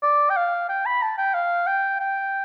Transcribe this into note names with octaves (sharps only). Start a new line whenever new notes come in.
D5
G5
F5
G5
B5
A5
G5
F5
G5
G5